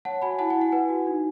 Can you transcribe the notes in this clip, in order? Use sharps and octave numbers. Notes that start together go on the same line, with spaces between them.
C#5 F#5 A5
F#4 G#5 B5
E4 F#5 A5
G#5
E4
F#5
B4 G#5
F#4
D#4